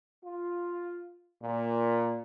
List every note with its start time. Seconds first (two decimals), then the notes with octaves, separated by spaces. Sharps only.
0.25 F4
1.42 A#2